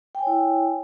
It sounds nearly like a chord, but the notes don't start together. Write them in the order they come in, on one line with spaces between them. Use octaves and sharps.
G5 G#5 C#5 E4